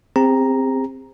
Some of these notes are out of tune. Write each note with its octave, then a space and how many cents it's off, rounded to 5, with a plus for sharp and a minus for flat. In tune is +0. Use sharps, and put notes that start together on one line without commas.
C4 +0 G#4 -45 A#5 +0